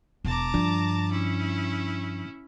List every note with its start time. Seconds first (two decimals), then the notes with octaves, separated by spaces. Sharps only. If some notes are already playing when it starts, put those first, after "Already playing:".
0.24 E1 A5 A#5 D6
0.54 G2 D3 F3 D4
1.11 C#4 E4